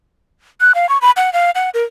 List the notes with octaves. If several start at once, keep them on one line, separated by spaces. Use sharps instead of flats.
F#6
F5
C#6
B5
F#5
F5
F#5
A#4